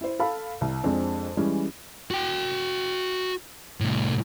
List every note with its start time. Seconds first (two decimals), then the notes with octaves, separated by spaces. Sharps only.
0.01 E4 C5
0.19 A4 F5 B5
0.61 C2
0.84 F2 G#3 C4 D4
1.37 E3 G3 G#3 C#4
2.11 F#4 G5
3.81 C2 A2